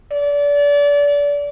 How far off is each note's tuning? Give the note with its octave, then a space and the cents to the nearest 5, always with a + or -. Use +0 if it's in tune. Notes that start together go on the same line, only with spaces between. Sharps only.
D5 -30